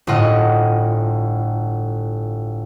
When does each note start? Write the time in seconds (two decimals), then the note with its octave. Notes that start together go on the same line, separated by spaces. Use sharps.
0.07 G1 A2 F4 D#5 F#5